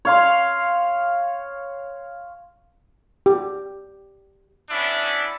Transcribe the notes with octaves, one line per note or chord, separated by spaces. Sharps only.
C#5 F5 C6
G4
B3 C#4 D4 E4 E5